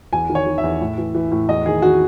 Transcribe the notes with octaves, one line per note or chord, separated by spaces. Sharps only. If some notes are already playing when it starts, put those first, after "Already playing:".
E2 G#5
D#3
C#5
D#3
E5
E2
A2
E3
E3
A2
E2 D#5
D#3 G#4
D#3 F#4